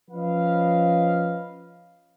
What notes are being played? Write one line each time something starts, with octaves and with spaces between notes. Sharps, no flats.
F3 C#4 B4 D#5 F5